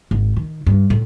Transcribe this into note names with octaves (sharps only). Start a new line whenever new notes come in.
G#1
D#3
G2
A2